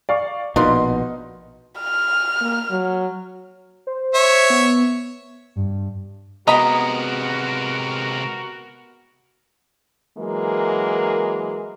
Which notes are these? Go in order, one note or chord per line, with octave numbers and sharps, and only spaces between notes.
D5 F5 C#6
A#1 B2 D4 D#4 F4 A#4 C6
F6
A#3
F#3
C5
C#5 E5
B3
G2
C3 G#3 B3 F#4 A#4 D#5 A#5 B5
E3 F#3 G#3 A#3 A#4